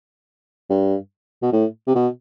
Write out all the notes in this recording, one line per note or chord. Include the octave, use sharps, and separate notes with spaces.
G2
B2
A2
C3
B2